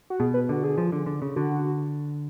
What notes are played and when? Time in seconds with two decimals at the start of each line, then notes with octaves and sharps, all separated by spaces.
0.10 F#4
0.20 B2 G#4
0.34 B4
0.49 D3 F#4
0.64 G#4
0.78 F3
0.92 D3
1.06 D3
1.22 C#3
1.36 D3 F#4